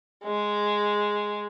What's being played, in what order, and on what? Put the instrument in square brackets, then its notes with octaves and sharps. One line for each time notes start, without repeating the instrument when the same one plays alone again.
[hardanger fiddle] G#3